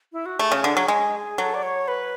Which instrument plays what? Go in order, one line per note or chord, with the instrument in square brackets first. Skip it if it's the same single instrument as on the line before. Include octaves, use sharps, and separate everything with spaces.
[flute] E4
F#4
[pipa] A3 [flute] G#4
[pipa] C#3
D3
F#3
G#3
[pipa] F#3 [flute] A4
[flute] D5
C#5
B4